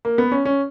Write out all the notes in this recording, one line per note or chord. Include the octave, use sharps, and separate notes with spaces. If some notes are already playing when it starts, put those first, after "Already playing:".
A#3
B3
C#4
C#4